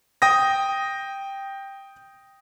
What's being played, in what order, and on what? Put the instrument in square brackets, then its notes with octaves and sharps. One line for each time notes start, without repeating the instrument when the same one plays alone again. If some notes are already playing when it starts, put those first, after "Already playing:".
[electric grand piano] G5 D#6 A#6